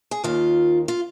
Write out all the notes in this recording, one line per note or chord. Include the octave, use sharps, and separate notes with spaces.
G#4
D#2 D#3 F4
F4